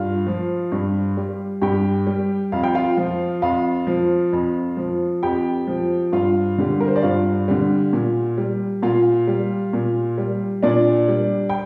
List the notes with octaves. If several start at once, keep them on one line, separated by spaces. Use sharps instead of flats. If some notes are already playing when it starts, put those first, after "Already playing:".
Already playing: G2 F4 F5
F3
G2
G3
G2 G4 G5
G3
F2 F5
G5
F4 F5
F3
F2 F4 F5
F3
F2
F3
F2 G4 G5
F3
G2 F4 F5
D3 G3
A#4
C5
D5
G2 F4 F5
D3 G3
A#2
G3
A#2 F4 F5
G3
A#2
G3
A#2 D4 D5
G3
G5